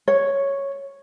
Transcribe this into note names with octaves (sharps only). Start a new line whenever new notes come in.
C#5